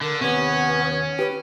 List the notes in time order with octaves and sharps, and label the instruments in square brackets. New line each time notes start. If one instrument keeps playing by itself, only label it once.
[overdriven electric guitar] D3 [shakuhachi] A#4
[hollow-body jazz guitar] D#2 C3 [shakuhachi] B3 [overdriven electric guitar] C#4 [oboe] C#5
[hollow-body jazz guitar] G4 [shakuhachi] B4